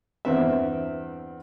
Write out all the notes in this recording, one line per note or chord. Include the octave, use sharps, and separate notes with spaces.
E2 G2 C4 E5